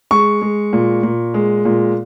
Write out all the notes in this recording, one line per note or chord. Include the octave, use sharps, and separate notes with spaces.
G#3 C#6
G#3
A#2
A#2
G#3
A#2